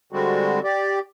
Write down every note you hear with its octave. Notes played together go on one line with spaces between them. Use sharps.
D3 G3 G#3 C4 F#4
G4 D5